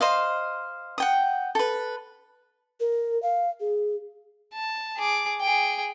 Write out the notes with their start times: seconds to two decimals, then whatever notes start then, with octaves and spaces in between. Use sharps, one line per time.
0.01 C5 D#5 F5
0.98 F#5 G5 D#6
1.55 A4 B4
2.80 A#4
3.23 F5
3.60 G#4
4.54 A5
4.98 G#4 D6
5.41 G#4 G5